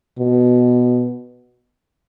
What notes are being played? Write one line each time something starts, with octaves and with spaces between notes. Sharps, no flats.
B2